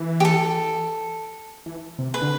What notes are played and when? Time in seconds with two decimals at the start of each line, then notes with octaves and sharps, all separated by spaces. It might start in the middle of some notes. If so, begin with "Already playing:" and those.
Already playing: E3
0.20 G4
0.25 A4
1.66 E3
1.99 C3
2.14 B4
2.22 D3